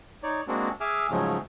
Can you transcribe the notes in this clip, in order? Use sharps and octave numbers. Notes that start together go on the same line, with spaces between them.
D#4 C#5 D5
G#3 A#3 C4 D4 F#4
G#4 E5 G#5 D6 E6 F6
G#2 C#3 F3 F#3 G#3 A3